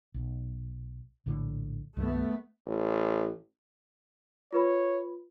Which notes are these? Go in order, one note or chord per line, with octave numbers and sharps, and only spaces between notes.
B1
A#1 A2 D3
C2 G2 D#3 A3 B3
A1
F4 B4 C#5 B5